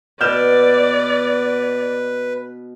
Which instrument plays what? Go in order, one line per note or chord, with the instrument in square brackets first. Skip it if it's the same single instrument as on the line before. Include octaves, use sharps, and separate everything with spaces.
[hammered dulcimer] B2 [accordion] B4 [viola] D5 [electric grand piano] F6 G6 E7